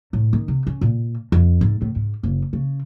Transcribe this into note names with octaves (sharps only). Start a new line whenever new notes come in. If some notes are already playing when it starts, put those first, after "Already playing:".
A2
D#3
C3
C#4
A#2
F2
G#2
A2
G#2
F#1
C#3